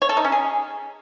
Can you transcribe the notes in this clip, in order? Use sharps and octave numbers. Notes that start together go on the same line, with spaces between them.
C#5
A4
D#4
C#4
G#4